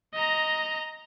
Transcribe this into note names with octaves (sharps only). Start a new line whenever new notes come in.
D#5 A#5